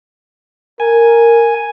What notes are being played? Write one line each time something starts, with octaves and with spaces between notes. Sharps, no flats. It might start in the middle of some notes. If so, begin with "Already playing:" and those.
A#4 G#5